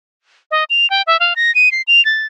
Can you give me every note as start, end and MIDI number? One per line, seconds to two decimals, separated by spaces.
0.51 0.64 75
0.70 0.89 101
0.90 1.02 79
1.07 1.20 76
1.20 1.34 77
1.36 1.54 94
1.55 1.72 99
1.72 1.82 96
1.88 2.04 101
2.05 2.26 93